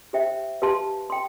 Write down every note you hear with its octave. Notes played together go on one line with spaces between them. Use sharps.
G4 C5 E5 G5
G4 B4 F5 A5 C6
G5 C6